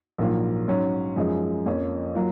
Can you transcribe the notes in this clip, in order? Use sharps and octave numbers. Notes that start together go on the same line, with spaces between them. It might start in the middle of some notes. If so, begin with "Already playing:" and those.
A#1 G#2 F#3 A#3 F4
G#2 F#3 C#4
F#2 F3 G#3 D#4
F2 F3 A#3 C#4
F#3 A#3 F4